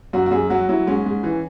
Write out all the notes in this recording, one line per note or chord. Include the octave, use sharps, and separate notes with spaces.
F#2 F#4
F#4
F#2 G#4
F#3 F#4
F#3 E4
G#2 C#4
G#2
E3